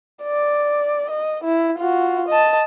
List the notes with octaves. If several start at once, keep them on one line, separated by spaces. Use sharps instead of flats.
D5
D#5
E4
F4 F#4
D#5 A5